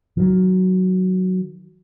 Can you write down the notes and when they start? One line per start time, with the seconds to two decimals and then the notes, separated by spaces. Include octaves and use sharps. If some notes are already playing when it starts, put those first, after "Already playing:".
0.17 D#3 F#3